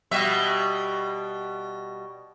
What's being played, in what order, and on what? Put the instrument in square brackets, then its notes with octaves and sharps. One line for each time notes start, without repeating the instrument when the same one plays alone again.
[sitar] B2 G3 E5